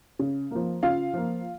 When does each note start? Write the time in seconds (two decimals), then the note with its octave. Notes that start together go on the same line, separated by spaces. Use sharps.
0.19 C#3
0.51 F3 A#3
0.82 C#3 F4 F5
1.14 F3 A#3